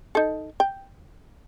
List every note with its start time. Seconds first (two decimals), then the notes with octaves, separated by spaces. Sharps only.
0.15 D#4 A4
0.60 G5